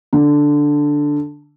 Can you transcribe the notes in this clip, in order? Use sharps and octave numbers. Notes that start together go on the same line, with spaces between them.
D3